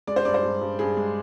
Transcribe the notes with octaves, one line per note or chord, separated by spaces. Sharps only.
G#3 D5
C5
G2 D5
C5
G2
G2
G2 G#4
G#3